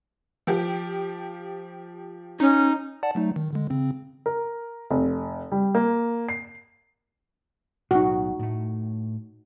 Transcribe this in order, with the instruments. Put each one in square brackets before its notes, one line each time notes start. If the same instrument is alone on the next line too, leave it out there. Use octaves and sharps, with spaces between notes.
[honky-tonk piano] F3 G4
[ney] C#4 [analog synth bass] D#4
[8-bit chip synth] D5 F#5 A5
F#3 A3 D#4
D#3
D3 G#3
C#3 C4
[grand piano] A#4
F1
G3
A#3
C7
[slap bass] B1 A2 [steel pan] D#4 F#4
[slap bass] A2 A3